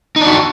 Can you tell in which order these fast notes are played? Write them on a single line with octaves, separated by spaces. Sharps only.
D#4 D4 F#4